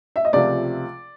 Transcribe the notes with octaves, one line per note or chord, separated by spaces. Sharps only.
E5
D#5
C#2 C3 F3 A3 D5